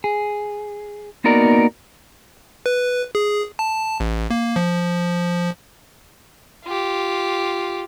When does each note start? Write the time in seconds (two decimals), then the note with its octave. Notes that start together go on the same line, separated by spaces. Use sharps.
0.04 G#4
1.24 A#3 B3 D#4 F#4 A#4 D5
2.66 B4
3.15 G#4
3.59 A5
4.00 A1
4.30 A#3
4.56 F3
6.65 F4 G4